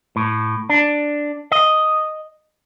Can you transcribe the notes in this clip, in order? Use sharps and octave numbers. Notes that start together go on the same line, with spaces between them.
A2
D4
D#5